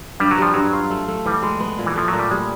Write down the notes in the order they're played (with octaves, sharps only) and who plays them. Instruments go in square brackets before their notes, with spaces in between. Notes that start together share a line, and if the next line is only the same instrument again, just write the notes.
[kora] G2 [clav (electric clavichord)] G3
[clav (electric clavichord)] F#3
[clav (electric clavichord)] F3 [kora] G3
[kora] G2 [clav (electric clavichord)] F#3
[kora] F4
A3
A3
[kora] E3 [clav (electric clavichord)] G3
[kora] G#3
B3
A#2
[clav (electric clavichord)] E3
[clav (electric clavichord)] F3 [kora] A3
[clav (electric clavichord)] F#3
[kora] A#2
[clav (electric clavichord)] G3
[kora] G3 [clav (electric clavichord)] G#3